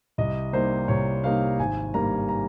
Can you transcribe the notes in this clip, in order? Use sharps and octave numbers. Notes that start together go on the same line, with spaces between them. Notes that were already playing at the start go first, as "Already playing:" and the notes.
C2 D#5
C3 G3 A#3 D#4 C5
C2 C#5
C3 G3 A#3 D#4 F5
G#1 G#5
G2 G3 A#3 A#5
A#5